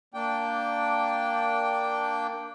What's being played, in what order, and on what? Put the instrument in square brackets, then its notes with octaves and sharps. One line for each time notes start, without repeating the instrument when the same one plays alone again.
[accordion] A#3 D4 G5